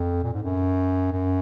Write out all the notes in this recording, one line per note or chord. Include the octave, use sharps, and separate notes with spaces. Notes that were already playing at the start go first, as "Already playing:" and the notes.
Already playing: F2
A#2
G#2
F#2
F#2